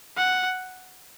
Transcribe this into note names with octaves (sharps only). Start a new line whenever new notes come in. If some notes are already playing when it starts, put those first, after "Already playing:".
F#5